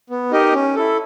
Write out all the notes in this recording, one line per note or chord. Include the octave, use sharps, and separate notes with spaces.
B3
D#4 G4 A#4 D#5
C#4
E4 A4